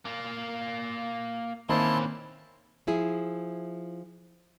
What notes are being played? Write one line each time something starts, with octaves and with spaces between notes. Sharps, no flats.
A#3 F4
D#3 E3 A#3 C4 C#4 E4 A5 C6
F3 E4 G#4